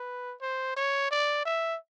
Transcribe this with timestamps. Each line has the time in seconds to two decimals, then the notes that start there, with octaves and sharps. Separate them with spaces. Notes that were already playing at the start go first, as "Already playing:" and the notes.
Already playing: B4
0.42 C5
0.77 C#5
1.11 D5
1.46 E5